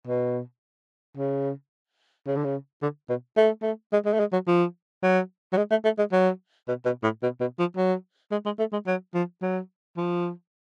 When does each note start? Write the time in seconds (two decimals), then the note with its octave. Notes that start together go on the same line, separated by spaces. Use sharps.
0.07 B2
1.17 C#3
2.27 C#3
2.36 D3
2.44 C#3
2.82 D3
3.10 B2
3.37 A3
3.62 A3
3.93 G#3
4.06 G#3
4.13 A3
4.20 G#3
4.33 F#3
4.47 F3
5.03 F#3
5.53 F#3
5.57 G#3
5.71 A3
5.85 A3
5.98 G#3
6.12 F#3
6.68 B2
6.85 B2
7.03 A2
7.23 B2
7.40 B2
7.59 F3
7.77 F#3
8.32 G#3
8.46 G#3
8.59 A3
8.73 G#3
8.87 F#3
9.14 F3
9.42 F#3
9.97 F3